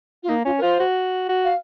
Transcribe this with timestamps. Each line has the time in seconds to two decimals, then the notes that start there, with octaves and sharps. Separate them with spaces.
0.23 F4
0.29 A#3 D#4
0.45 C#4 F4
0.58 A#4
0.62 F4 C5
0.80 F#4
1.29 F#4
1.44 F5